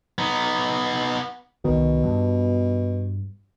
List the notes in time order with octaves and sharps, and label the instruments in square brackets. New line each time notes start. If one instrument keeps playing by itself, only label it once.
[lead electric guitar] B3 D#4
[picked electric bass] C2 D#3 [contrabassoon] B2
[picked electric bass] G2